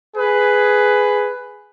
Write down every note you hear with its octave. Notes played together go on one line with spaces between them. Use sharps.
G#4 B4